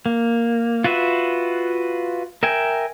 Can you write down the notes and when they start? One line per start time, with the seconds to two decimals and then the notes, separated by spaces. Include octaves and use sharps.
0.06 A#3
0.84 F4 F#4 B4 E5
2.43 A#4 E5 G5 G#5